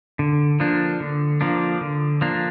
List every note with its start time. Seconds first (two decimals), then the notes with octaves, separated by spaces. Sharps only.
0.19 D3
0.60 F3 A#3 D4
1.00 D3
1.41 F3 A#3 D4
1.81 D3
2.21 F3 A#3 D4